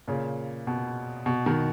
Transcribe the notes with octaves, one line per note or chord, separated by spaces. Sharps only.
A#2 C#3
B2
B2
B2 D#3